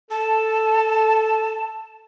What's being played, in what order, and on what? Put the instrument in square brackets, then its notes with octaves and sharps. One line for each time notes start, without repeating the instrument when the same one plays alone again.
[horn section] A4 [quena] A5